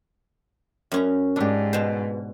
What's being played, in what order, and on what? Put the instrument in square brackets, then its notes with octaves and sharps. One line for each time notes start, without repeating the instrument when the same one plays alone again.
[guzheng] F#2 C#4 A#5
[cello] G#2 [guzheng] D4 G4
[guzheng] B2 C5